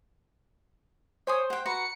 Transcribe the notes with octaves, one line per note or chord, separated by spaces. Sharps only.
C5 C#5 G#5 D#6
F#5 G5
F#4 B4 A#5 C#7